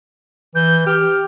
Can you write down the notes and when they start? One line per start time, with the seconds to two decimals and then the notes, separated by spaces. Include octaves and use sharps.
0.55 E3 G6
0.86 G4 F6